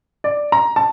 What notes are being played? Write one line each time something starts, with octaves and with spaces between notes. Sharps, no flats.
D5
A#5
A5